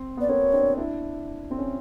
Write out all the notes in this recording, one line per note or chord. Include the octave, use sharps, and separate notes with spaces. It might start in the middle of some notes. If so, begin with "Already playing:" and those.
Already playing: C4
B3 D5
A#3 C4 C#5
C4 D4
D4 E4
C4
C#4